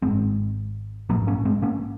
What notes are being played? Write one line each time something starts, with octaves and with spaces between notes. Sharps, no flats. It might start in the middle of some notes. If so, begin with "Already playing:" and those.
G#1 G#2 G#3 C4
A#1 G#2 F#3 A#3
A#3 C#4
G#3 C4
A#3 C#4